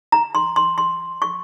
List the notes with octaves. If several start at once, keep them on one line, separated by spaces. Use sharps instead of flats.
A#5
C6
C6
C6
C#6